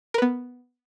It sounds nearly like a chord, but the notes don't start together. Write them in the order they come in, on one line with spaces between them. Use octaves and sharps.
A#4 B4 B3